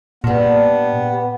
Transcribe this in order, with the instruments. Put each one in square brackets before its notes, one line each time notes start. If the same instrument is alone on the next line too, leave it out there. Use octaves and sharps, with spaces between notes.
[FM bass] A#2 [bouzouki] G3 D4 [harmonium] B3